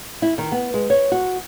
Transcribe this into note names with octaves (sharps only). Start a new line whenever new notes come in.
E4
D#3
B3
G#3
C#5
F#4